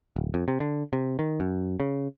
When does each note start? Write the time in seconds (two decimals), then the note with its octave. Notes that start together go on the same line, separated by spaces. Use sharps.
0.16 D1
0.34 F2
0.48 C3
0.60 D3
0.93 C3
1.19 D#3
1.40 F#2
1.80 C#3